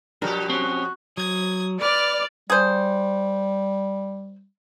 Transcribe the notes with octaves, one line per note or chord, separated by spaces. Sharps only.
B2 F3 G3 D4 G4 A#4
C4 C#4 F#4
F#3 D#6 G#6
B4 D5 F6
G3 G#4 C5